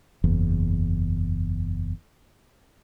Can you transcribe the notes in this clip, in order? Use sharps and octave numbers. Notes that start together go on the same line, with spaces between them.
F#1 E2